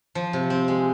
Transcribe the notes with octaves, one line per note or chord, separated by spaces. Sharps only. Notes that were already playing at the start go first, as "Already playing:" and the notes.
F3
C3
C4
G#3